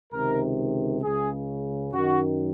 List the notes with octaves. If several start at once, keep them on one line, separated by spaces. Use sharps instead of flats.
C#2 C3 D#3 A#4
C#2 C#3 G#4
F#2 D#3 F#4